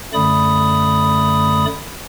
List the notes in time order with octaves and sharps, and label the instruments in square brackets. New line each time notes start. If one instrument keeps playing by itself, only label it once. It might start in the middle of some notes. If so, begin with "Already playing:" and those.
[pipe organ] F#2 D3 A3 D5 B5 D#6